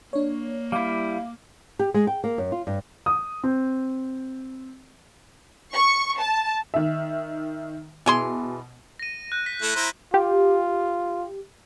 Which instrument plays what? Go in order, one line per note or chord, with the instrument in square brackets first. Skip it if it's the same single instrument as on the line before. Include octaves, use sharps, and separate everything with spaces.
[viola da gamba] A#3 [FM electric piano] D4 C#5
[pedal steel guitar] G3 E4 [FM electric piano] F5 D6
[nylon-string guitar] G4
G#3
G5
A#3
F#2
F4
G2
[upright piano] D#6
C4
[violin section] C#6
A5
[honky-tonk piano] D#3 E5
[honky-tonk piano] B2 [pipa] E3 G#4 C6
[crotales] A#6 D#7
F#6 G6
B6
[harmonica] A3 E4
E4 C5 A#5
[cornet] F4 [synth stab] G4